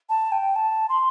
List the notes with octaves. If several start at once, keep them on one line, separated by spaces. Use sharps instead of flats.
A5
G5
A5
C6